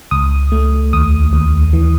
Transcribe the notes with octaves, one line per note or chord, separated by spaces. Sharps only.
C#2 D#6
A3
D#2 D#6
D#2
E3